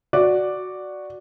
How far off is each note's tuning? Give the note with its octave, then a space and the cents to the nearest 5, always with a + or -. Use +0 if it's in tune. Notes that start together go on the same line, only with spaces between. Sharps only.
F#4 +0 D5 +0